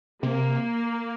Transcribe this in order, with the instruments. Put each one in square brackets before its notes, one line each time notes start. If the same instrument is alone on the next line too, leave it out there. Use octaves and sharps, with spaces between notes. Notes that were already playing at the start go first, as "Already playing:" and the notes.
[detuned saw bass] C3 [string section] A#3